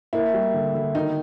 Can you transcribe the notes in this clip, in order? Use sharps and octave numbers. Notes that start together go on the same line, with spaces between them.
A#3 E4
G3
D3
D3
D#3 D#4